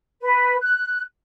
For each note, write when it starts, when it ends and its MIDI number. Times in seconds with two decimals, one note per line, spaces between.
0.21 0.56 71
0.61 1.00 90